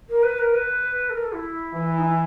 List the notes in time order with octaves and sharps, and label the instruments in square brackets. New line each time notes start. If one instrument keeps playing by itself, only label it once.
[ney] A#4
B4
A#4
B4
A4
A#4
A4
E4
[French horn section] E3
[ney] D#4
E4